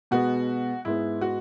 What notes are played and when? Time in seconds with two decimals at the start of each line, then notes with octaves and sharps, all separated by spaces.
0.11 B2 G#3 B3 F#4
0.85 G#2 G#3 B3 E4
1.21 F#4